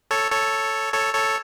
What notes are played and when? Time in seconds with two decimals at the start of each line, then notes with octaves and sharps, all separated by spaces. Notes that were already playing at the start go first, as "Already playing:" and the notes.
0.11 A4 C#5
0.32 A4 C#5
0.93 A4 C#5
1.14 A4 C#5